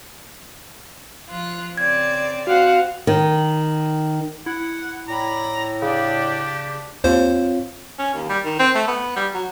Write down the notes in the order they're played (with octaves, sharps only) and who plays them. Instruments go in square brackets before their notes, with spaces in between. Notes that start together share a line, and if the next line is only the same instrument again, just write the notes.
[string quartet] F3 F4 F#6
[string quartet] C#3 C4 D5 [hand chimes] G#6
[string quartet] C4 [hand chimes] F#4 [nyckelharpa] F5 F#5
[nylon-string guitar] D#3
[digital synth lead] E4 [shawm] F#5
[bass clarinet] A2 [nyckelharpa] D5 B5 [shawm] A#5
[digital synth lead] C#3 [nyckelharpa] D4 D5 [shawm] G4
[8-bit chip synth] D#2 C5 [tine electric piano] C4 F4 C#5
[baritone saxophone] C#4
D#2
G3
D#3
C4
A3
B3
G3
F#3